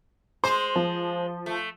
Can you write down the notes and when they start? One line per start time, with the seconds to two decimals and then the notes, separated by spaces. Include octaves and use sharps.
0.44 G#3 C5 C6
0.76 F3
1.46 A3